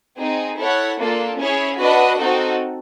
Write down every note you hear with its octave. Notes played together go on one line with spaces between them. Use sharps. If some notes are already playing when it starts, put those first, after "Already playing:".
C4 D#4 G#4
E4 A4 C#5 F#5
A#3 D4 F4 A4
C#4 E4 G#4 C#5
D4 F#4 B4 D#5 F#5
C4 D#4 F#4 A4